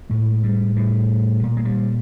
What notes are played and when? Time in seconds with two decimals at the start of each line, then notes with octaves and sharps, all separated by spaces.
0.10 A2 G#3
0.44 G3
0.76 A2 G3
1.43 A#2
1.57 G#3
1.65 G3